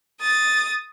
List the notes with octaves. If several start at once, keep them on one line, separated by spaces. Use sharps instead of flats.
D#6 A6